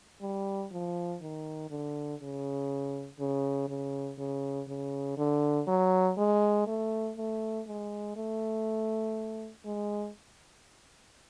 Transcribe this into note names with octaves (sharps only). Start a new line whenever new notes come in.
G3
F3
D#3
D3
C#3
C#3
C#3
C#3
C#3
D3
F#3
G#3
A3
A3
G#3
A3
G#3